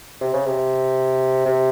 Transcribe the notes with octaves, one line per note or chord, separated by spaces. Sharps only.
C3
C#3
C3
C3